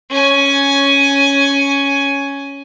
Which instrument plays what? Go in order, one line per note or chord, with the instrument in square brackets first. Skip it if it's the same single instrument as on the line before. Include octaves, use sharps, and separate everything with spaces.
[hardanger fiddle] C#4 G#5